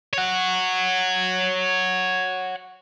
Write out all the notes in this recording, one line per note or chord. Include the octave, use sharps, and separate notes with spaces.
C#5 F#5